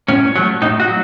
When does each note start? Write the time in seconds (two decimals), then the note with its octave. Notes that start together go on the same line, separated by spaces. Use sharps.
0.08 A2 C#4
0.36 F#3 A3
0.62 A2 D#4
0.80 F#4
0.88 F#3